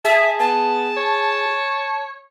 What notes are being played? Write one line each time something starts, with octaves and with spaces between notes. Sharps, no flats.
G#4 E5 A5
B3 A5
C#5